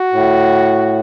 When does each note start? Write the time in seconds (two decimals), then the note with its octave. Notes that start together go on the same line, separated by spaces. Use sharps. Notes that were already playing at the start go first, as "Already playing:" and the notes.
Already playing: F#4
0.12 A2